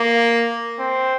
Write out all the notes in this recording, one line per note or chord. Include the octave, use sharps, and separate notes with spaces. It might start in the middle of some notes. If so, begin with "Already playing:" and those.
Already playing: A#3
C4